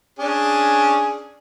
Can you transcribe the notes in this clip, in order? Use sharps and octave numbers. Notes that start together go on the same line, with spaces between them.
C#4 D4 G#4